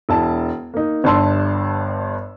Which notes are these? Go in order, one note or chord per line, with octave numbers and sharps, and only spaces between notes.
E1 E4 A5
A#3 D#4
G1 G2 D4 A5 C6 E6